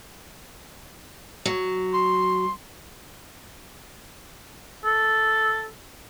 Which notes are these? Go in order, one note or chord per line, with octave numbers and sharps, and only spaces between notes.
F#3
C6
A4